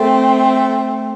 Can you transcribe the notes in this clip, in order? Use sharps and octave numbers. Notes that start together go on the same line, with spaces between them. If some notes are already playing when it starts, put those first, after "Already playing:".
Already playing: A3 C4